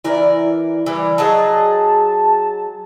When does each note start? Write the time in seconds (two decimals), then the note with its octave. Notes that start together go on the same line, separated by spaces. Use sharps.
0.04 E3 E4 A#4 D5
0.86 E3 G3
1.18 F#3 G#4 D#5 A5